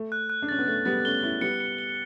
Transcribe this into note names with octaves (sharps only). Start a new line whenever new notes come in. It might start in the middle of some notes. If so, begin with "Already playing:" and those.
Already playing: A3
F#6
F#6
D4
C#4 A6
B3
A3 A6
G3 B3 A6
A3 C#4 G7
C#4 E4 A6
G3 B3 C#7
C#7
G7